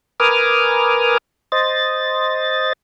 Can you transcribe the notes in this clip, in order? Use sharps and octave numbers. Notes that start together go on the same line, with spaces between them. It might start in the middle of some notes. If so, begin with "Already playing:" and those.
A#4 B4 G#5 D6 D#6 F6
C5 D#5 A6